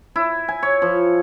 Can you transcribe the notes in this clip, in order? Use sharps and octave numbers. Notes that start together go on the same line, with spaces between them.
E4
G#5
C#5
F3